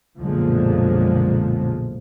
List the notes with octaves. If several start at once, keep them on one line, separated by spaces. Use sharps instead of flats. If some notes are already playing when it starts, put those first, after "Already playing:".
B1 F#2 A#2 D3 F3 G#3